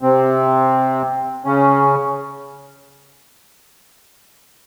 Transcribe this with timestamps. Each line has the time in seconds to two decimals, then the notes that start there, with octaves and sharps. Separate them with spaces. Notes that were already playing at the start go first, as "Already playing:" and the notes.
0.02 C3 C4
1.45 C#3 C#4